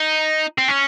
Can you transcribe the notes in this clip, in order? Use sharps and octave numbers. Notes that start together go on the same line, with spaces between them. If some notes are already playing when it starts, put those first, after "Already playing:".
Already playing: D#4
C4
C#4